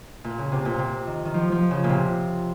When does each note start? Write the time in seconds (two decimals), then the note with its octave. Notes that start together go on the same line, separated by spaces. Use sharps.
0.24 A#2
0.38 C#3
0.52 C3
0.65 A#2
0.79 C3
1.07 D#3
1.25 D#3
1.34 F3
1.52 F3
1.71 C#3
1.84 A#2
1.89 C3